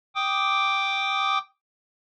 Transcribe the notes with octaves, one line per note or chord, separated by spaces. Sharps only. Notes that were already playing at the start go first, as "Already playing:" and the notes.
G5 D6 D#6